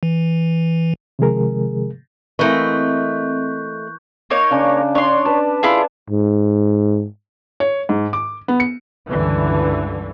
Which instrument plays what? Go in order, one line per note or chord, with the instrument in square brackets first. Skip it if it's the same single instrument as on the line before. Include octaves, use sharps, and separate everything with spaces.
[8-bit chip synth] E3
[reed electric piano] C3 D#3 F3 G#3 G#4 A#4
[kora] E3 A#3 [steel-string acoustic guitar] A3 D#5 [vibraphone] C4 [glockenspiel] C#6 F#6 G6
[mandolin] A#3 D#4 C#5
[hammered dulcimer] C#3 D4
[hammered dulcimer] D4 [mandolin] C#5 C6
[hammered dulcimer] B4 A5
[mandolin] E4 F4 G#4
[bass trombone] G#2
[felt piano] C#5
G#2
D6
B3
C#7
[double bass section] C#2 G2 D3 E3